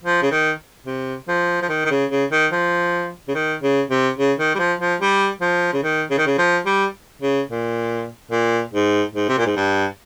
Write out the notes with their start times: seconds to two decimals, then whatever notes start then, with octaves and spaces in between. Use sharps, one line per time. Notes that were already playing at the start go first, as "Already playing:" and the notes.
0.04 F3
0.22 C#3
0.31 D#3
0.86 C3
1.28 F3
1.62 F3
1.69 D#3
1.85 D#3
1.90 C#3
2.10 C#3
2.32 D#3
2.52 F3
3.28 C#3
3.35 D#3
3.63 C#3
3.90 C3
4.18 C#3
4.38 D#3
4.55 G3
4.59 F3
4.80 F3
5.01 G3
5.41 F3
5.73 C#3
5.83 D#3
6.11 C#3
6.18 D#3
6.26 C#3
6.38 F3
6.66 G3
7.22 C#3
7.49 A#2
8.31 A#2
8.74 G#2
9.15 G#2
9.29 C3
9.38 A#2
9.46 G#2
9.56 G2